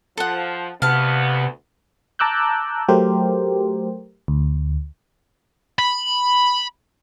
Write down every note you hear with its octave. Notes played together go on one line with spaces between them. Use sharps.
F3 A4 F#5
D2 C3 B3 F5 A5
A5 A#5 D6 E6 F#6 G6
F#3 A3 G4 A#4 C5
D2
B5